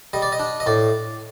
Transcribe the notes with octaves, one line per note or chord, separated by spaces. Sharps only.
G3 D#5
D5
D#5
D4
D#5
A2 D5